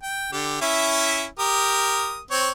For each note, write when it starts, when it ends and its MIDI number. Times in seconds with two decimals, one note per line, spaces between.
0.03 0.32 79
0.32 0.58 50
0.32 0.58 67
0.61 1.26 61
0.61 1.26 64
0.61 1.26 76
1.39 2.20 67
1.39 2.20 70
1.39 2.20 87
2.31 2.50 60
2.31 2.50 73